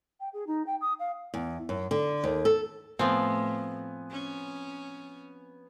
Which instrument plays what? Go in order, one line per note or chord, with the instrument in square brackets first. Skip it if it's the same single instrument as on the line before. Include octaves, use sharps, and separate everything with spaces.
[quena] G5
G#4
D#4
G5
D#6
F5
[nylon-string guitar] E2
F#2
D3
D#2
A4
[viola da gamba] A2 [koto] F3 C4 [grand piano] B3 G#5
[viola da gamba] C#4